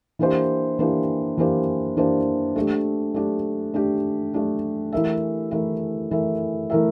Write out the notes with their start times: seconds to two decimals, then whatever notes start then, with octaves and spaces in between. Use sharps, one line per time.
0.19 E3 A#3 D4 G4 C5
0.79 E3 A#3 D4 G4 C5
1.38 E3 A#3 D4 G4 C5
1.97 E3 A#3 D4 G4 C5
2.56 A3 D4 G4
3.14 A3 D4 G4
3.74 A3 D4 G4
4.34 A3 D4 G4
4.92 E3 A3 E4 A#4 E5
5.51 E3 A3 E4 A#4 E5
6.11 E3 A3 E4 A#4 E5
6.70 E3 A3 E4 A#4 E5